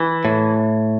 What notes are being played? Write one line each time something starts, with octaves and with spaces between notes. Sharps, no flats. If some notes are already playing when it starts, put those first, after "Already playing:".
Already playing: E3
A2